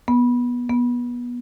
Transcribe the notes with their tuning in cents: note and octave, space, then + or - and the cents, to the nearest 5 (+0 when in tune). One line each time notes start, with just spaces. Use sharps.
B3 -20
B3 -25